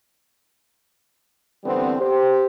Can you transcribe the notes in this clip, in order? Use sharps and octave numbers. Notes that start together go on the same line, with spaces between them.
D3 E3 G3 B3 C4
G4 C5